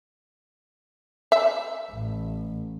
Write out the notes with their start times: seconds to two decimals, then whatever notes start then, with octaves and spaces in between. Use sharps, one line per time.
1.32 E5
1.91 A1